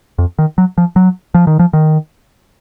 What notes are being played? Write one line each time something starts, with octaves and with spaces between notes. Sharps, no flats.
F2
D#3
F#3
F3
F#3
F3
D#3
F3
D#3